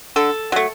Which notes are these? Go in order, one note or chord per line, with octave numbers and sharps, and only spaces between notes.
D3 A4
F#3 A3